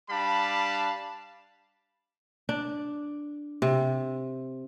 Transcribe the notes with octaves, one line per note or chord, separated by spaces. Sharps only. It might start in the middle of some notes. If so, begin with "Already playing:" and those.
G3 D4 F5 A5 B5
D4
C3